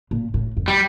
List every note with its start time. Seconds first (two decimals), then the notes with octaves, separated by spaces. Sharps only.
0.11 A#2
0.34 A2
0.57 F2
0.68 G3